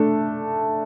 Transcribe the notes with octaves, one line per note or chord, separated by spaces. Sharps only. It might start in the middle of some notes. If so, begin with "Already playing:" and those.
Already playing: A3 D4 A4